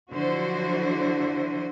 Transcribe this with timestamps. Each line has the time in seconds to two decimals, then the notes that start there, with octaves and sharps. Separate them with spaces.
0.12 D3 F3 F#3 E4 F#4 C5